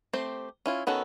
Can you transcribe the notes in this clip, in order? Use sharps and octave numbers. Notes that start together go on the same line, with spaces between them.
A3 C4 G4 C5
C#4 E4 F4
D#3 B3 C#4 F#4 A4